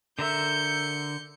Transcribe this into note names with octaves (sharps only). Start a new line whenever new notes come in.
D3 A#4 E5 G6 C#7